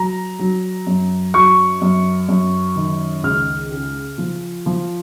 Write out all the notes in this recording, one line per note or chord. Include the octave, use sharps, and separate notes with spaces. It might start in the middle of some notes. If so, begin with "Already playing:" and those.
Already playing: F#3 A#5
F#3
F#2
F#3 C#6
F#2
F#2
D#3
C#2 F6
C#3
F3
F3